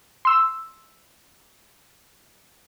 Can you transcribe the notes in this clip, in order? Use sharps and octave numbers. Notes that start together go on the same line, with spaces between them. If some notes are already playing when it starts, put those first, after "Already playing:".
C6 E6